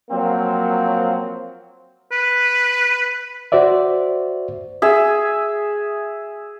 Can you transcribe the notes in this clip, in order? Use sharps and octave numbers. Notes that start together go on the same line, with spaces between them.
F3 F#3 A#3 C4
B4
F#4 C5 D5 E5
G#4 E5